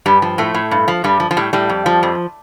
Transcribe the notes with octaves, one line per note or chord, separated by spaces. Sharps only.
G2 G3
F3
A2 A3
A2
G2
F3
G2 G3
F3
F3
A2 G3
A2 G3
F2
F3
F2